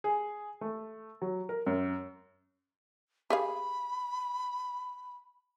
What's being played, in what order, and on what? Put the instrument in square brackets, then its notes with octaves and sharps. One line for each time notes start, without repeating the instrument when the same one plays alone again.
[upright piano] G#4
A3
F#3
A#4
F#2
[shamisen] G4 G#4 F5 [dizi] B5